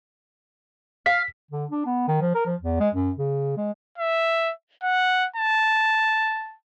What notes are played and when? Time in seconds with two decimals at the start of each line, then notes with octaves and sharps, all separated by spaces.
1.06 F5 B6
1.51 D3
1.71 D4
1.86 B3
2.08 D#3
2.21 F3
2.35 A#4
2.46 F3
2.61 E2
2.80 G#3
2.94 F#2
3.18 C#3
3.57 G#3
3.98 E5
4.83 F#5
5.36 A5